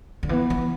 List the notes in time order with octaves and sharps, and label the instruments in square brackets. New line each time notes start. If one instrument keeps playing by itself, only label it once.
[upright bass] D3
[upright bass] E3 [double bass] B3
[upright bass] E3